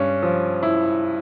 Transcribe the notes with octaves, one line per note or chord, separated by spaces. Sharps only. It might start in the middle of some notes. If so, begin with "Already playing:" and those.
Already playing: G2 C#4
F3
E4